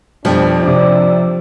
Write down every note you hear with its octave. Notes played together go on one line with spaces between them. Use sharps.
F2 B2 F3 G3 D4
C3 D4 D5